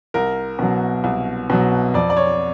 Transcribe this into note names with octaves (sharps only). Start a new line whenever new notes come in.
C2 A#4
B2 F#3
C2
B2 F#3
F2 D5
D5
C#5